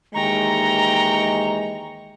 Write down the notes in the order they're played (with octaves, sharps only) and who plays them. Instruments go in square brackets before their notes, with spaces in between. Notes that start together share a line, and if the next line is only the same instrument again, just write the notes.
[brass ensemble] D#2 E3 G#3 [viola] G5 C#6 [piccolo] A#5